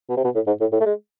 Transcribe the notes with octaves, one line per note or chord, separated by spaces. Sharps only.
B2
C3
B2
A2
G#2
A2
A2
A3
G#3